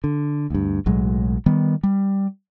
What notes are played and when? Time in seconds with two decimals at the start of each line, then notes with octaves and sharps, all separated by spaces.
0.04 D3
0.50 D2 G2
0.86 B1 A2 F#3 G#3
1.46 D#3 G3 B3
1.83 G3